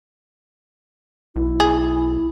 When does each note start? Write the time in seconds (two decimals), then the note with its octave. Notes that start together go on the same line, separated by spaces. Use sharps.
1.36 B1 E4
1.60 G#4